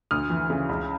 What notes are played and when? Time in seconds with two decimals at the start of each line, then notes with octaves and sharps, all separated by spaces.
0.11 D2 D#6 F6
0.30 E3
0.50 C#3
0.69 C#2